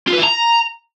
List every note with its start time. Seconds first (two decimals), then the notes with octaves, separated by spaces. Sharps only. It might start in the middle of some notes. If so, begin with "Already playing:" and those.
0.08 F4
0.14 B4
0.19 E4
0.24 A#5